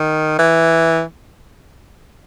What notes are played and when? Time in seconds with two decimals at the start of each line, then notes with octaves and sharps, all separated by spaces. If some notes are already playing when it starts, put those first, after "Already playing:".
Already playing: D#3
0.39 E3